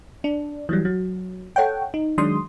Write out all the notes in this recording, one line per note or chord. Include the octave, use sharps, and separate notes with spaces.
D4
E3 F#3 G3
F#3
A4 C#5 F#5 G5
D#4
D#3 F#3 G#3 D4 C6 D#6